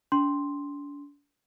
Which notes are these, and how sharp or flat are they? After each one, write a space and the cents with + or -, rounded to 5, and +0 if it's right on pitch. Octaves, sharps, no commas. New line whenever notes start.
D4 -40 C6 +0